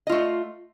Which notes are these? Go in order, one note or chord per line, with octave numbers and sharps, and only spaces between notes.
A3 F4 D#5